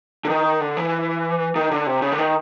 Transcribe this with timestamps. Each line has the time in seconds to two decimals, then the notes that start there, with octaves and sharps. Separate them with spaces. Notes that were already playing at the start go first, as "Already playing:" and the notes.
0.25 D3
0.30 D#3
0.60 D3
0.77 E3
1.56 D#3
1.71 D3
1.87 C3
2.02 C#3
2.12 D3
2.18 D#3